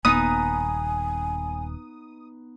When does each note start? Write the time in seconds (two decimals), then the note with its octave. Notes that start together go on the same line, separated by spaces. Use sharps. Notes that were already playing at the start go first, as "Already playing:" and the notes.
0.05 D#1 B3 D#4 G#5 D#6